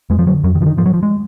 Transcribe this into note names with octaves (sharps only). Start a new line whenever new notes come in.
F2 G#3
F3
D3 F#3
F2 F#3
D#3
D3 F3
D#3
G#2 F3
F#3
F3
G#3